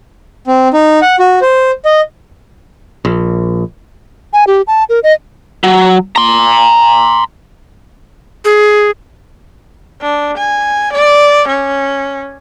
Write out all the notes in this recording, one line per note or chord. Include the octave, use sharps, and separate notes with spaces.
C4
D#4
F#5
F#4
C5
D#5
A#1
G#5
G4
A5
A#4
D#5
F#3
A#5 C6
G#4
D4
G#5
D5
C#4